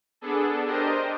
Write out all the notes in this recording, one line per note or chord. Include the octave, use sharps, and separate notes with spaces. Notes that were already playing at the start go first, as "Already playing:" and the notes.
B3 D4 G#4 A4
D4 G4 A#4 C5 D#5